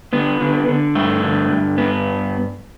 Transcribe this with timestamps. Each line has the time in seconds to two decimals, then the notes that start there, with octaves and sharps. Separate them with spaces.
0.13 D3 B3
0.41 D3
0.69 D3
0.95 G2 A3
1.23 D3
1.51 G2
1.78 G2 B3